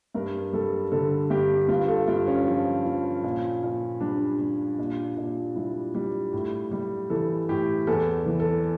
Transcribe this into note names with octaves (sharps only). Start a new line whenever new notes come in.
G2 A#4
G3 A4
D3 A4
G2 G4
G2 F4
A4
G2 F4
C#4
F3
F3
A#2
A#2
G3 D4
G3
A#2
A#2
G3 E4
G3
A2
G3
E3 A4
A2 G4
E2 A4
E3
A4